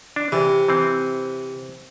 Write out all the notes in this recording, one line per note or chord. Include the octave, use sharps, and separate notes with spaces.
D4
C3 E3
E3 C4